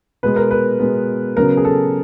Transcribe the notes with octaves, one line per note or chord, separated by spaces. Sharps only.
B2 G#3 B3 B4
A#4
B4
B2 G#3 B3
C#3 F#3 B3 A#4
G#4
A4